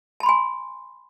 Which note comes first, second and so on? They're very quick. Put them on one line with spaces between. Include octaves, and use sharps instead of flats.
A5 B5 C6 G#5